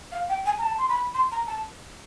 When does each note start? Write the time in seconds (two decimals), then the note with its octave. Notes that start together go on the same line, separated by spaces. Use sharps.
0.12 F5
0.29 G5
0.46 G#5
0.58 A#5
0.63 A5
0.78 C6
0.89 B5
1.14 C6
1.31 A#5
1.47 A5